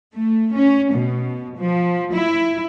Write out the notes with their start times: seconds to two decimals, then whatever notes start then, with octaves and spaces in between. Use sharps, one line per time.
0.14 A3
0.55 C#4
0.93 B2
1.58 F3
2.13 E4